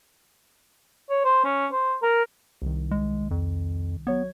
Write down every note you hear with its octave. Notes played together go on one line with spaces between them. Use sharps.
C#5
C5
C#4
C5
A#4
C2 D#3
G#3
F2
F#3 B3 C#5 G#6